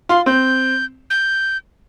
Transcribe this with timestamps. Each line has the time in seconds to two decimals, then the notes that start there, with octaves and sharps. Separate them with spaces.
0.09 F4 C6
0.26 C4 G6
1.10 G6